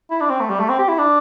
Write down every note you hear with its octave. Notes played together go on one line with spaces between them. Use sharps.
E4
D4
C4
A3
G3
A3
C4
G4
E4
D4